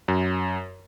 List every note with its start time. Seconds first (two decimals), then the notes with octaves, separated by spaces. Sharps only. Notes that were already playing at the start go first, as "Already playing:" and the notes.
0.08 F#2